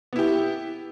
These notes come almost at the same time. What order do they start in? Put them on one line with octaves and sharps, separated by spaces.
B3 E4 G4